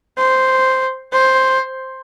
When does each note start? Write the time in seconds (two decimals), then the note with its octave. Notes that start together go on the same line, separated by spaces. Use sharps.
0.17 C5
1.13 C5